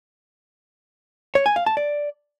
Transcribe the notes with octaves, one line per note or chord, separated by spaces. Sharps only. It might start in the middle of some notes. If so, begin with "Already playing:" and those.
C#5
G#5
F5
A5
D5